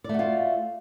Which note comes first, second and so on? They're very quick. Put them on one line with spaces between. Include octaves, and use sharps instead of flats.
D5 A3 F#4 F4